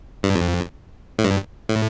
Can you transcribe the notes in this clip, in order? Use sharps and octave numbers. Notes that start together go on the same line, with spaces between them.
G2
F2
A2
G2
A2